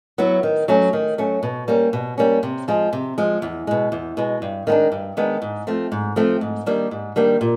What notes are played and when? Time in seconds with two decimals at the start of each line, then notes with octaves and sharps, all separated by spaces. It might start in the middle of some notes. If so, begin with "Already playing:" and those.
0.18 F#3 B3 E4
0.43 D#3
0.68 F#3 A3 C#4
0.93 D#3
1.18 F#3 A3 C#4
1.43 B2
1.68 G3 A#3 C#4
1.93 B2
2.18 G3 A#3 C#4
2.43 C3
2.68 F3 G#3
2.93 C3
3.18 F3 G#3
3.42 E2
3.67 B2 G#3
3.92 E2
4.17 B2 G#3
4.42 G2
4.67 D#3 G#3 B3 D4
4.92 G2
5.17 D#3 G#3 B3 D4
5.42 G#2
5.67 F3 A3 C4
5.92 G#2
6.16 F3 A3 C4
6.41 G#2
6.66 D#3 G3 A#3 D4
6.91 G#2
7.16 D#3 G3 A#3 D4
7.41 A#2